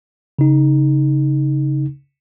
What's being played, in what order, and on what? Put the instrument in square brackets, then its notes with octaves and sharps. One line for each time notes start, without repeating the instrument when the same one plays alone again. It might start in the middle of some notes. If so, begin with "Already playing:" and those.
[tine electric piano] C#3 D#4